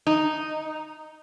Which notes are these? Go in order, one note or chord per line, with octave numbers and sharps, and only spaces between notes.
D#4